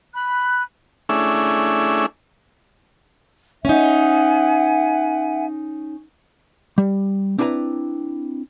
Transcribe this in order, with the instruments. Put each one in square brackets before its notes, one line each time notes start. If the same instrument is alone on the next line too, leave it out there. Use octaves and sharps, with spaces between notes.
[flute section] B5 F#6
[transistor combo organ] A3 C#4 D4 E4 G#4 E5
[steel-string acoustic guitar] C#4 D#4 [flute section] E5 F#5 G#5
[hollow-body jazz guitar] G3
C4 D4 E4 B4 G#5 A#5